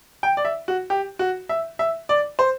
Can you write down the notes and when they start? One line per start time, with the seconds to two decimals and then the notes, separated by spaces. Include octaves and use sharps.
0.23 G5
0.37 D5
0.45 E5
0.68 F#4
0.90 G4
1.19 F#4
1.49 E5
1.79 E5
2.09 D5
2.39 C5